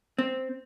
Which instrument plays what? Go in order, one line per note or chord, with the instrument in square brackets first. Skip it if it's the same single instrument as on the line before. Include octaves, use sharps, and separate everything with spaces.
[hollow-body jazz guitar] C4